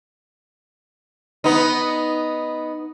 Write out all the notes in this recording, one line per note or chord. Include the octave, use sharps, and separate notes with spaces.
B3 D#4